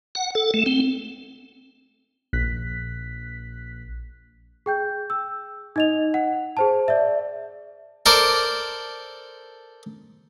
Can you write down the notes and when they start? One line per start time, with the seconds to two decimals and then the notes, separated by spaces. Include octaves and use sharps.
0.15 F#5
0.35 A4
0.54 A3
0.66 C4
2.33 A#1 F#6 B6
4.66 G#4 G5 G6
5.10 E6
5.76 D#4 D#5 F7
6.14 F#5
6.57 G#4 C5 A5
6.88 D5 E5
8.06 A4 A#4 C5 D5